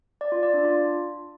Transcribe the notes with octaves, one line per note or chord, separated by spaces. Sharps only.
D5
F4
D5
D4
F4